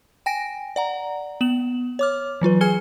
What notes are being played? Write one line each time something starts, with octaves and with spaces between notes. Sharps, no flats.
G5 G#5 A#6 D7
D5 F#5 A#5
B3 E7 F#7
C#5 D6 F6
E3 F#3 F4 B4
G#4 G#5 F6 G#6 C#7 G7